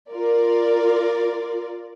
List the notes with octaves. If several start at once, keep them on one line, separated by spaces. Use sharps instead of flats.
F4 A#4 D5